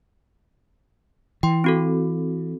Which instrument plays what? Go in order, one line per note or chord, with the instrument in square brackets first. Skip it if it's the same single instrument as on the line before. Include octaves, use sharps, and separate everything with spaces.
[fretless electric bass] E3 [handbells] G5 C6
[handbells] C4 F#4 A4